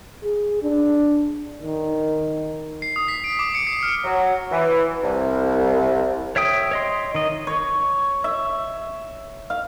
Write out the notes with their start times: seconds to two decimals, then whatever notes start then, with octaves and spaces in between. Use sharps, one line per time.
0.24 G#4
0.63 D4
1.62 D#3
2.82 C7
2.96 D#6
3.08 B6
3.24 D7
3.39 D6
3.55 C#7
3.67 C7
3.83 F6
4.04 F#3
4.51 E3
5.03 C2
6.36 C#5 E5 G5 D#6
6.71 C#5 D#5 C6
7.15 D#3 D#5
7.47 C#5
8.24 E5
9.50 F5